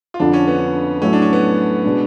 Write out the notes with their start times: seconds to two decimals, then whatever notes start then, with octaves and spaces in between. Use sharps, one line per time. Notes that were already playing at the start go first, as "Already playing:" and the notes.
0.14 F4
0.19 F2 D3 F3 D4
0.33 C#4
0.48 B3
1.02 A2 F#3 A3 C#4
1.13 D4
1.22 C#4
1.33 B3
1.85 B2 G#3 D4